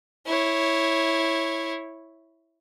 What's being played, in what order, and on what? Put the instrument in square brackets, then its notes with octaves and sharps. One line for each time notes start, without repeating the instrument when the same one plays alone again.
[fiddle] E4 C#5